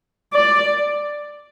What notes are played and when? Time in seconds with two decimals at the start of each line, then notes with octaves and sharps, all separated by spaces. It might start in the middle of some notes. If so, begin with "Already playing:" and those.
0.34 D5